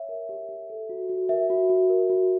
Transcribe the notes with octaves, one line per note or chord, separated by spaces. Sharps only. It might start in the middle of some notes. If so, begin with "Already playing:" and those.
Already playing: C#5 E5
A#4
G4
G4
A4
F#4
F#4
A#4 E5
F#4
F#4
A#4
F#4